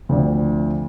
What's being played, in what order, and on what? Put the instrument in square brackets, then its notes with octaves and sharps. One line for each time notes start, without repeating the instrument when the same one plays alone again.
[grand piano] D2 F3 C4 D5